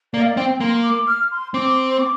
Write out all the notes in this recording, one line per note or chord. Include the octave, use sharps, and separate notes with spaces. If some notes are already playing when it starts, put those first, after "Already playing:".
A#3 D5
F5
D5
C4 G5
A#3 C6
D6
F6
C6
C4 D6
C6
D6